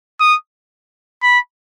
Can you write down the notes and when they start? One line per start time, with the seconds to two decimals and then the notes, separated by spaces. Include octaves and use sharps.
0.20 D#6
1.23 B5